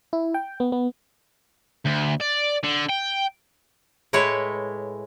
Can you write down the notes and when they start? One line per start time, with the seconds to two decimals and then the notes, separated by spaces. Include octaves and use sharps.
0.13 E4
0.34 G5
0.60 B3
0.72 B3
1.86 D2
2.21 D5
2.64 D3
2.90 G5
4.13 A2 G#3 E4 B4 C#5